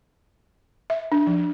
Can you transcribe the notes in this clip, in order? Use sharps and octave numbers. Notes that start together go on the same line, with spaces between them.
E5
D4
F3